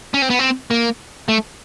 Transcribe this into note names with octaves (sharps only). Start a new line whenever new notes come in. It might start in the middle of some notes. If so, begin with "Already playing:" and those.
C#4
C4
B3
C4
A#3
A3